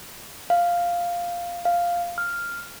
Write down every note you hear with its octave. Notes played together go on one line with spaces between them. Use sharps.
F5
F5
F6